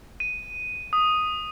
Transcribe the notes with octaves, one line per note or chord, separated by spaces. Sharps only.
D#7
D#6